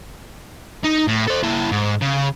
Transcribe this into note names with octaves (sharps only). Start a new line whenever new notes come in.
D#4
A2
A4 C5
A#3 E4
G#2
C#3